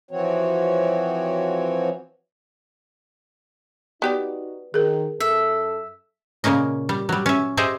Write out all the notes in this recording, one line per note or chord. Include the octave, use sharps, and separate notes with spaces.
E3 F3 C4 F#4 C#5
B3 D#4 F#4 G4 D5
D#3 G#4 A#4
F#2 A4 E5
A#2 C#3 A#3 C#4 D#5
G3
F#3 G3
C#4 E5
G4 G#4 C5 D#5 E5